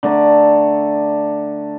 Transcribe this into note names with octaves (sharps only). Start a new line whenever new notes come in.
D3 A3 D5 A#5